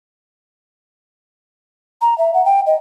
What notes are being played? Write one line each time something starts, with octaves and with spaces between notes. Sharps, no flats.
A#5
E5
F#5
G5
D#5